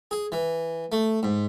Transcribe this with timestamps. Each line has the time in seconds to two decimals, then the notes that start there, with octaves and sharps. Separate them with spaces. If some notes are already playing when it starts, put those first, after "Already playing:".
0.11 G#4
0.32 E3
0.92 A3
1.23 G#2